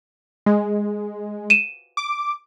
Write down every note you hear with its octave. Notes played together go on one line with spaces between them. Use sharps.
G#3
D#7 E7
D6